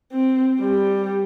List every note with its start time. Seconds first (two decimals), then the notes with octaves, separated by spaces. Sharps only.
0.12 C4
0.61 G3